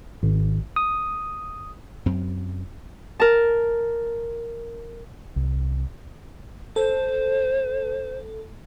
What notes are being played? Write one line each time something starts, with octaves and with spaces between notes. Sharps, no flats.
G#1
D#6
F#2 F#3 C4
A#4 A5
C2
A4 C5